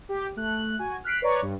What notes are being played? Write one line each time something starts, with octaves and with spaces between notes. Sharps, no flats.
G4
A3 F#6
F#4 G#5
F6 F#6 B6 C7 D7
B4 C#5 D5 A#5 C#6
G2